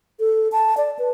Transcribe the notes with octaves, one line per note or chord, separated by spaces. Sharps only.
A4
A5
D5
B4